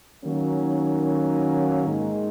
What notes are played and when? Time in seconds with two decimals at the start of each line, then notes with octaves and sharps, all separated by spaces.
0.24 D#3 F#3 A#3 C#4
1.86 G#2 D#3 G#3